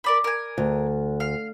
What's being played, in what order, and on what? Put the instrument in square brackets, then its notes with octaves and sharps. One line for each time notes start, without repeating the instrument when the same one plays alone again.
[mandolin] A#4 D5 B5
A#4 G#5
[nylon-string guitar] D2
[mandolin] F5